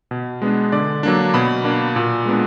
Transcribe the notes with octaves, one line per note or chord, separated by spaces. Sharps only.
B2
G#3 B3 D4
D3 D5
F#3 A#3 D4
B2 B5
A#3 D4
A#2
G#3 B3 D4